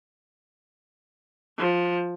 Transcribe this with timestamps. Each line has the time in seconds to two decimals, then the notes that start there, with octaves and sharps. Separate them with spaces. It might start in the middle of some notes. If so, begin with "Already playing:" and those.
1.58 F3